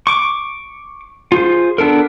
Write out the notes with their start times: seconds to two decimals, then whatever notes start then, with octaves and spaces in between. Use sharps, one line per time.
0.07 C#6 D6
1.32 F4 G#4 C5
1.78 B3 D4 A4 A#4